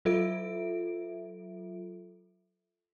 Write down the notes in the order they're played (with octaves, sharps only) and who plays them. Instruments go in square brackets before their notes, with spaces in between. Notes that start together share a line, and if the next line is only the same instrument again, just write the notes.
[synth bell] F#3 F4 A4 E5 D7